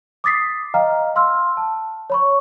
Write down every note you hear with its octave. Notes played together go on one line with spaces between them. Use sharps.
D6 D#6 A6 B6 C7
D#5 F5 G5 A#5 F6
F5 C6 E6 F6
A5
C#5 B5 C#6